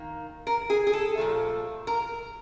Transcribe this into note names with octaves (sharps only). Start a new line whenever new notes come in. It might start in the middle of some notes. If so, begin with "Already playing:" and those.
Already playing: D#3 A#3
A#4
G#4
G#4
A4
A#2 F3 A3
A#4